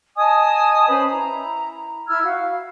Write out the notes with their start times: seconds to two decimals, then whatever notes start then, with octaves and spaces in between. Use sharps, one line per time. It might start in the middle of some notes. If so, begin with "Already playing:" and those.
0.16 D#5 G#5 A5 D#6
0.86 C#4 B4 C5 B5
1.10 E4 A#5
2.07 E4 E6 F6 G#6
2.23 F#4 F5